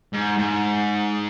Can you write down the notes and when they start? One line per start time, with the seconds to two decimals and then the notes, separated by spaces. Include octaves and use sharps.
0.13 G#2
0.38 G#2